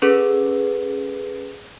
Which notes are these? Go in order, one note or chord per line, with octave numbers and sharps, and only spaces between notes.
C#4 G#4 A4 B4